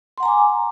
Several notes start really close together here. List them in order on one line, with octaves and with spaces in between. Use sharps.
C6 F#5 A#5 G#5 D6